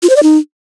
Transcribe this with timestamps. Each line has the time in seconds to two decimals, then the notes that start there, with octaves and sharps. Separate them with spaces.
0.03 F4
0.09 C5
0.16 D5
0.23 D#4